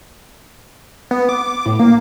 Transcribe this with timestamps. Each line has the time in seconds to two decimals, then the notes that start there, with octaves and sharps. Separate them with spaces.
1.11 B3
1.29 D6
1.66 A2
1.79 A#3